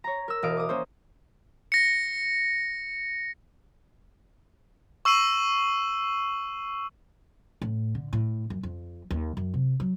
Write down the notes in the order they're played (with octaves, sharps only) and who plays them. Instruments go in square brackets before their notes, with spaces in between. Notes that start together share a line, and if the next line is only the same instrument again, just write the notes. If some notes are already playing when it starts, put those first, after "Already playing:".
[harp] C#5 A#5
A#4 E6
E1 D#5 F5 D7
D6 D#6
A#3 C#4 C5
[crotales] A#6 C#7
C#6 E6 C7 D#7 F#7
[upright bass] A2
D3
A2
F#2
F2
D#2
F#2
C3
F#3